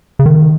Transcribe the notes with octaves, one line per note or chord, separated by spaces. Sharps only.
C#3
D#3